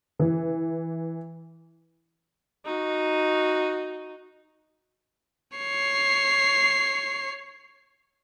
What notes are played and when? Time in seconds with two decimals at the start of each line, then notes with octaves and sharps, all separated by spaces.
0.19 E3
2.65 D#4 F#4
5.57 C#5 C7